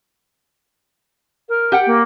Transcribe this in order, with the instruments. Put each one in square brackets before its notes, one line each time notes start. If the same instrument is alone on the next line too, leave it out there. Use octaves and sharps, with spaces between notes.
[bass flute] A#4
[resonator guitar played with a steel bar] G4 F#5 G5
[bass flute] A#3